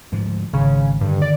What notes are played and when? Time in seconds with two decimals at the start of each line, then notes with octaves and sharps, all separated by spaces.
0.12 D2 G#2 F3
0.53 G#1 C#3
1.01 G2 D3 D#3
1.22 D5